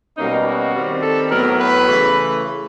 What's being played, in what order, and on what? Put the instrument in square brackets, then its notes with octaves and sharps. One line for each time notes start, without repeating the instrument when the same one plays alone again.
[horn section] B2 G3 A#3 C#4 D#4
F#4
D#3 G3 C4
A4
A2 F#3 B3 A#4
B4
C#3 E3 A3